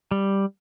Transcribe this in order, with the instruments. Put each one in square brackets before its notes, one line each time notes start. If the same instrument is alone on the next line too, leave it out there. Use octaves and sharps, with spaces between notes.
[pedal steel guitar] G3